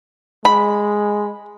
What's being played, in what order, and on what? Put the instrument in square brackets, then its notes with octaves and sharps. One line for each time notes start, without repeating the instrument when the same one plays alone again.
[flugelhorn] G#3 [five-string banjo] B5